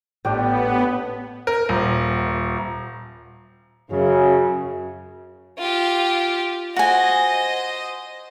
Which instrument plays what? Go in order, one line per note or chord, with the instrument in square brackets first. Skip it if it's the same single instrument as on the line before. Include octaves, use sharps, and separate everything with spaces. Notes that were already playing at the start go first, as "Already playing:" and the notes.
[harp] A1 [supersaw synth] B3 [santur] D4 G4 G5
[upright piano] A#4
D#1
[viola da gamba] F#2 [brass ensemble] C#3
[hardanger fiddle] F4 G4
[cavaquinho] F#4 G#5 [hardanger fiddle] C5 D#5